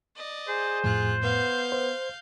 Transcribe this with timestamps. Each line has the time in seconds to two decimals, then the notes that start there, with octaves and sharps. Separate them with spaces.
0.17 D5 D#5
0.48 G#4 C5
0.84 F2 A2 F4 F#6
1.23 B3 F5 G6
1.72 C5